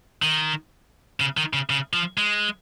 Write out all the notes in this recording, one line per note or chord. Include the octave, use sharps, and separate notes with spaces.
D#3
C#3
D#3
C#3
C#3
F3
G#3